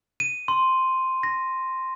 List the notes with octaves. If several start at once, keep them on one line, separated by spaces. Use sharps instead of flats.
D#7
C6
A#6